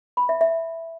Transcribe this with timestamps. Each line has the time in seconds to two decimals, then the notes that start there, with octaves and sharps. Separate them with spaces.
0.17 B5
0.29 E5
0.41 E5